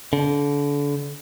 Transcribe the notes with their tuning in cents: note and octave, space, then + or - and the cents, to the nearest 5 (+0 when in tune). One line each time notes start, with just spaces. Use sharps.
D3 -35